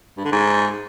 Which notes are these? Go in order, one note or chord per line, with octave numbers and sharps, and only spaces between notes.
G2
D3
G#2